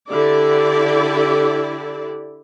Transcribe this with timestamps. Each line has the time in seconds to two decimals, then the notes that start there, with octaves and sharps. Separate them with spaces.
0.10 D3 E4 G4 D5